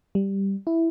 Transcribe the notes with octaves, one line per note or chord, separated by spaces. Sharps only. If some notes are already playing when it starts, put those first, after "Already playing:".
G3
E4